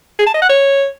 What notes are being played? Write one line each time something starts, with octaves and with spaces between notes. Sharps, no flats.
G#4
A5
D#5
F#5
C#5